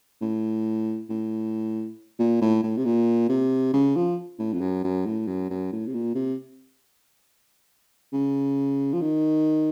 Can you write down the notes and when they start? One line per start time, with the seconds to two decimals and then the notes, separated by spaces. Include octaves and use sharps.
0.21 A2
1.10 A2
2.19 A#2
2.41 A2
2.63 A2
2.77 C3
2.85 A#2
3.29 C3
3.73 C#3
3.96 F3
4.39 A2
4.53 F2
4.61 F#2
4.84 F#2
5.06 A2
5.27 F#2
5.50 F#2
5.72 A2
5.87 C3
5.94 A#2
6.15 C3
8.13 C#3
8.93 F3
9.02 D#3